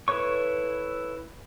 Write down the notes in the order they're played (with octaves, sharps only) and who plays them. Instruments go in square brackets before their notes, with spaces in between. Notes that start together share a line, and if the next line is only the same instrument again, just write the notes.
[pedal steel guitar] E4 A4 B4 C#5 C#6